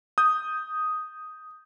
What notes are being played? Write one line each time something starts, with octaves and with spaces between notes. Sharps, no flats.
D#6 G6